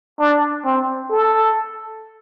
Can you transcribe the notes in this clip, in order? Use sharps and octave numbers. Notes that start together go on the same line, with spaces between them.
D4
C4
A4